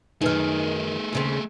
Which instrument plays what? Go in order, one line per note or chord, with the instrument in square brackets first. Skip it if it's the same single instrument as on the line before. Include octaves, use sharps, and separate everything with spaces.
[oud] F#2 D#3 [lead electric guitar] A3 G#4 [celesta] D#4 B4 F6
[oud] D#2 C#3 C4